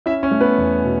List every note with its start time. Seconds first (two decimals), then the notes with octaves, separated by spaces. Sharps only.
0.06 C#4 E4 E5
0.23 C#4 C#5
0.31 A3
0.40 B3 B4
0.58 E2
0.83 B2